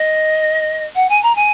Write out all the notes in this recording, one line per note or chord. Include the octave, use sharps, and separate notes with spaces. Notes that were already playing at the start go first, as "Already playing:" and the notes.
Already playing: D#5
F#5
G#5
A#5
G#5